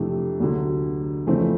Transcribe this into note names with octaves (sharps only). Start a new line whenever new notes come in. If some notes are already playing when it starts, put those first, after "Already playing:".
Already playing: F2 C3 E3 A3 D4
D2 D3 F#3
F2 C#3 E3 A3 C4